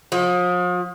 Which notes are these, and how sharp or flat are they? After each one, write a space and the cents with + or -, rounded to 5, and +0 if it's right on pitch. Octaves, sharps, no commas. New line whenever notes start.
F3 +40